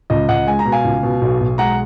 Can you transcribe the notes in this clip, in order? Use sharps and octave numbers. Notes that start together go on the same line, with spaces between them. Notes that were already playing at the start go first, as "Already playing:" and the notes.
C#2 D#5
C#2 D#5 F#5
G#3 G#5
A#5
B2
F5 G#5
C#2
B2
B1
B1
G#3 F#5 A#5